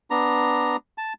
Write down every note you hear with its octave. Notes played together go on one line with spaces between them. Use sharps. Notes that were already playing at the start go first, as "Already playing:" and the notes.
B3 D4 A#5
A5